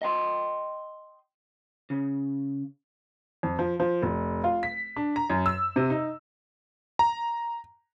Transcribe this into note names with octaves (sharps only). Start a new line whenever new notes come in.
D#5 G5 C6
C#3
F2
F3
F3
F1
F4
B6
D4
A#5
F#2
E6
C3
D#4
A#5